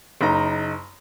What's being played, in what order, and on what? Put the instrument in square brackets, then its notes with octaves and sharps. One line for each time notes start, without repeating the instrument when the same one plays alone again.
[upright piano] F#1 D#4 D#5 A#5